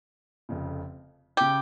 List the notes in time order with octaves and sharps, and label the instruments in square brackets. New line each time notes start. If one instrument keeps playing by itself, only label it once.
[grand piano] F1 F2 C#3
[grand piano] C#3 [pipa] G4